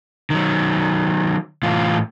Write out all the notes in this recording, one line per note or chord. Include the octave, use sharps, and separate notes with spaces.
D#3 F#3
A2 E3 F4